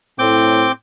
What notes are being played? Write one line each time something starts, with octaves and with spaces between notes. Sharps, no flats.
A2 C4 D6 G6